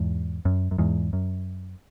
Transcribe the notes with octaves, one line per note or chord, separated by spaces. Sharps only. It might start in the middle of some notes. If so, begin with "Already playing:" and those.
Already playing: E2 G#2
F#2
F#2
E2 G#2
F#2